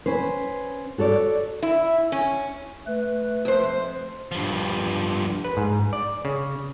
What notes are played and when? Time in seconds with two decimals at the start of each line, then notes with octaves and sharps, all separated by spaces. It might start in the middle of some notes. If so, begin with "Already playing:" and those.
0.06 C#4 B4 C5
0.98 F#4 A4 C#5 D5
1.63 E4
2.12 C#4
2.87 A3 B4
3.45 F2 C5
4.32 G2 F3
5.44 B4
5.57 G#2
5.93 D5
6.25 C#3